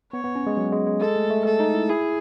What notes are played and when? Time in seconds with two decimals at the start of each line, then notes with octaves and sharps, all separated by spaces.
0.13 B3 C#5
0.24 B3
0.36 C#4
0.47 G#3
0.57 F#3
0.72 G#3
0.87 G#3
1.01 G#3 A4
1.16 A3
1.31 A3
1.45 A3 A4
1.60 D#4
1.74 E4
1.89 E4 G#4